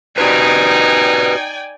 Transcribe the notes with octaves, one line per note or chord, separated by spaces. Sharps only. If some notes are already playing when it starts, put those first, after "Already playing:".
D#4 F#4 G4 B4 D5 G5 G#5